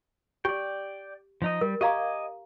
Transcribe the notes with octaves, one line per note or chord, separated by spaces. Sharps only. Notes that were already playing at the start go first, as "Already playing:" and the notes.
G4 D5 G5
F3 D#4 D#5
G3 A#4
G4 D#5 F5 G#5 A#5 D6